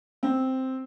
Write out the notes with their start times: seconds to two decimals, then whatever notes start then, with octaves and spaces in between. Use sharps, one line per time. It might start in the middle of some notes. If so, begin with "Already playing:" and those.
0.23 C4